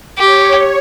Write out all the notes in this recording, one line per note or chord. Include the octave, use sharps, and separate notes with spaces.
G4 C#5